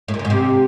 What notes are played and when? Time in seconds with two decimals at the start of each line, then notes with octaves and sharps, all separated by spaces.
0.08 A2
0.14 A#2
0.19 C#3
0.25 G#2
0.30 C3